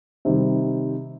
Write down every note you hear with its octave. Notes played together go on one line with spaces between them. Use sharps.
C3 D#3 G3